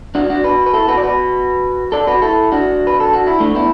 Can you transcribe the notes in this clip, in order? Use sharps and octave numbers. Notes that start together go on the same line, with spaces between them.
D4 F#4
D4 F#4
F#4 B4
B4
E4 A4
F#4 B4
D5
F#4 B4
A4 D5
F#4 B4
E4 A4
D4 F#4
B4
A4
F#4
E4
A3 D4
B3 E4